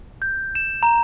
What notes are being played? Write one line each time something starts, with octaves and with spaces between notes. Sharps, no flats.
G6
E7
A#5